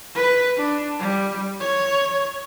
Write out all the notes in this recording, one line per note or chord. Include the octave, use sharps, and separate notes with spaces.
B4
D4
G3
C#5